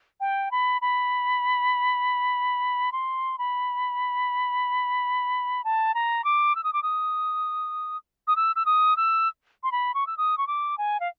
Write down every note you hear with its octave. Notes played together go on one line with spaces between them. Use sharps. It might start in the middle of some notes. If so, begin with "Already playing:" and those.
G5
B5
B5
C6
B5
A5
A#5
D6
E6
D#6
D6
D#6
D#6
E6
E6
D#6
E6
C6
B5
C#6
E6
D#6
C#6
D6
G#5
F5